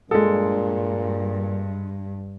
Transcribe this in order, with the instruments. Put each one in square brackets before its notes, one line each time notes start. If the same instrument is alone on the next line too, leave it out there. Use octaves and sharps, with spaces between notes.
[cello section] G2 [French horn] A#2 [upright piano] G#3 A4